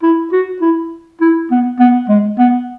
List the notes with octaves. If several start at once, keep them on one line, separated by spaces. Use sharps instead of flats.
E4
F#4
E4
E4
B3
B3
G#3
B3